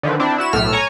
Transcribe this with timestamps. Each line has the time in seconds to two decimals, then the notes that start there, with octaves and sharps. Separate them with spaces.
0.03 D3 D#3 F3 B4
0.19 C4 D4 E4
0.38 E4 F#4 E7
0.53 B1 A2 A3 E6 F6
0.72 C#5 G#5 A#5 C#6